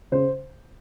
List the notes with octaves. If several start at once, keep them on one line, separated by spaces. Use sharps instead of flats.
C#3 C5